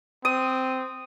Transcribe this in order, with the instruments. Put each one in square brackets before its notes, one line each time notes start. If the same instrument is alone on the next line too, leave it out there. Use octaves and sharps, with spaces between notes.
[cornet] C4 [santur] D#6